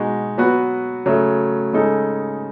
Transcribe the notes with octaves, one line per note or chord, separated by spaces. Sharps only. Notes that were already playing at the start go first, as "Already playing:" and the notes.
Already playing: B2 G#3 D#4 F#4
F#3 B3 F#4 B4
C#3 F#3 A3
C#3 G#3 D#4 A4